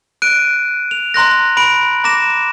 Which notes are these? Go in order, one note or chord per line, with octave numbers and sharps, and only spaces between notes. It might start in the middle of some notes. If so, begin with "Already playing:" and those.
F#6 D7 D#7
F7
A#5 C6 F#6 A#6
B5 D7 F#7
A#5 D6 A#6 E7